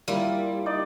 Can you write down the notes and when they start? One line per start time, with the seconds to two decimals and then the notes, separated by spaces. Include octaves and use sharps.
0.08 G3 A#3 E4 F4
0.66 D#4 D5 D#5